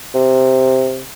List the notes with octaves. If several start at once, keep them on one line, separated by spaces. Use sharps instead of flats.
C3